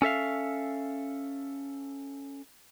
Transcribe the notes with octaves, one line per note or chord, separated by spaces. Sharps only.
C#4 A4 E5 F5